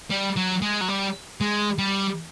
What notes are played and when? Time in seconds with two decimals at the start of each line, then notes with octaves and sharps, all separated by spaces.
0.10 G3
0.36 F#3
0.62 G#3
0.81 F#3
0.89 G3
1.41 G#3
1.79 G3